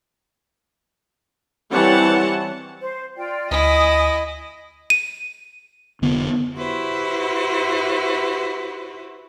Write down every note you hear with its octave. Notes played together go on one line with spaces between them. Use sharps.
E3 G3 C4 C#5 F#5 A5
C5
F4 D5 G5
D2 E4 D#5 G#5 D#6
D#7
F1 D3 B3
E4 F#4 G4 B4 C5